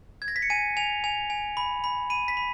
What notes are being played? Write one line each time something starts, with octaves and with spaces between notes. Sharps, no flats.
G#6
A#6
B6
C#7
G#5 D#7
G#5 F7
G#5 F7
G#5
B5
B5
B5 D#7
B6
B5